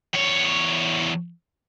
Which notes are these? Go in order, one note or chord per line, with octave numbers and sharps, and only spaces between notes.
E2 C#5